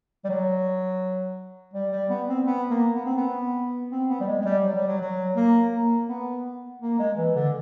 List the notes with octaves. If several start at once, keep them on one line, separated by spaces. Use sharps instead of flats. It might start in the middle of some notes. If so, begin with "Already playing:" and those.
G3
F#3
G3
G3
B3
C4
B3
A#3
B3
C4
B3
C4
B3
G3
G#3
G#3
G3
F#3
G3
F#3
F#3
A#3
A#3
B3
A#3
G#3
E3
D3